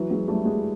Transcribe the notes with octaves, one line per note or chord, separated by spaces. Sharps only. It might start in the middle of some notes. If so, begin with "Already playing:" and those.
Already playing: E3 F#3
F#3 G#3
G3 A3
F#3 G#3